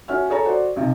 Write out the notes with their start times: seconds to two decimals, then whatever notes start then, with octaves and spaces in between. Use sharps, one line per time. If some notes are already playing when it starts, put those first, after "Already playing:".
0.08 C#4 F#4 E5 F6
0.30 G#4 A4 C#5 A#5
0.46 F#4 C5 D5
0.76 B1 C3